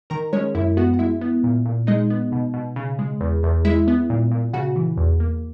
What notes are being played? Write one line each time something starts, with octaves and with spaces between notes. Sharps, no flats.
D#3 A#4 A#5
G#3 C#4 C#5
F#2 E4 E5
B3 F#4 F#5
F#5
G#3 E4 E5
B3
A#2
A#2
G#3 D#4 D#5
B3
B2
B2
C#3
G#3
E2
E2
G#3 E4 E5
B3
A#2
A#2
C#3 F#4 F#5
E3
E2
A#3